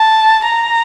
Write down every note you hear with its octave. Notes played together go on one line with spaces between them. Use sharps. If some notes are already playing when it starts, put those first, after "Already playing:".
Already playing: A5
A#5